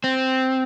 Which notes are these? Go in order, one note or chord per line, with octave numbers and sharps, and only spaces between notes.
C4